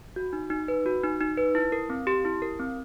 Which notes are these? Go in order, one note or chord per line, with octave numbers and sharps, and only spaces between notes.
F#4
D#4
D#4
B4
F#4
D#4
D#4
B4
E4
A#4
C4
G4
E4
A#4
C4